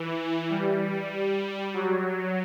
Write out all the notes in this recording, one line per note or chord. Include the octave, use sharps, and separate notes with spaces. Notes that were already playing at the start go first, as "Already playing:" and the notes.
Already playing: E3
G3
F#3